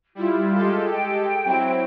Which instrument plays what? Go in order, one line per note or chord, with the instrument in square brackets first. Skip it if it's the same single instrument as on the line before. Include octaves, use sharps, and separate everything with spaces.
[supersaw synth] G3 E4 [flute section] F4
[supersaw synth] G#3 G4 A4
[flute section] G5
[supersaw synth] F#3 C4 E4